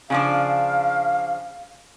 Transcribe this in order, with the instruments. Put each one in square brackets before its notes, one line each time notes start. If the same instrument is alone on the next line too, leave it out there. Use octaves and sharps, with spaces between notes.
[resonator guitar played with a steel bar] C#3 F3 D4 [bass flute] F5